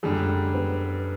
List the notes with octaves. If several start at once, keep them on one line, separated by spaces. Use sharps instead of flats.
F#2 D3 G3 G#3
B3